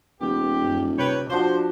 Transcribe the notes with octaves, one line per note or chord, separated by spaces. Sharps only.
D#1 B3 G4
F#2
C3 B4 C#5 G5
F3 D4 F#4 C5